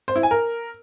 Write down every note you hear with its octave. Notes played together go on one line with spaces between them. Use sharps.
C5
E4
G#5
A#4